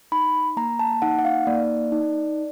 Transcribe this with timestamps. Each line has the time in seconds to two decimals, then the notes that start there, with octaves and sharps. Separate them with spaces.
0.12 D#4 B5
0.57 A#3 A#5
0.79 A5
1.02 D#4 F#5
1.19 F#5
1.25 F5
1.47 A#3 D5
1.92 D#4